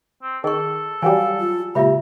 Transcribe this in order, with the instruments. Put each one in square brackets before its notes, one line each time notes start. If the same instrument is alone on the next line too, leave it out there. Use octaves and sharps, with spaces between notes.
[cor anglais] C4
[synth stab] D#3 [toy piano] G#4 C#6 [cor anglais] A4
[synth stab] E3 F#3 G3 [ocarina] F5 [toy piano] G#5
[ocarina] F4
[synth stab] C#2 A#2 [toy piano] F4 E5 B5 [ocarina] G4